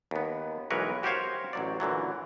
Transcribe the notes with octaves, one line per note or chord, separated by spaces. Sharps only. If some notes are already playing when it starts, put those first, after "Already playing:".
D#2 B3
B1 E3 G#3 A#4 B4 C#5
F#4 G4 A#4 C5 C#5 F5
A1 F#3 D5
A#2 D3 E3 F#3